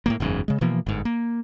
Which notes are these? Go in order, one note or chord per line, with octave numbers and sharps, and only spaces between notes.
A2 E3 A#3
F#1 E2 G#2 C#3
C#3 G#3
B2 E3 F3 A#3
G1 G#2
A#3